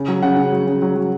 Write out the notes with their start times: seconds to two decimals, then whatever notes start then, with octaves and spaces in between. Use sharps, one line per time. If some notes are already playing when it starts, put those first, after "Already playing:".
Already playing: C#3
0.08 F#3
0.23 C#3 F#5
0.37 C#3
0.52 F#3
0.67 C#3
0.82 F#3
0.96 F#3